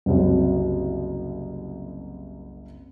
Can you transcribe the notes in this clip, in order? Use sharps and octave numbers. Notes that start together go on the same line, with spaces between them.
F#1 C2 F#3